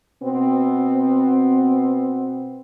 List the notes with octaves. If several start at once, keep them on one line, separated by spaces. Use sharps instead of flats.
B2 B3 C4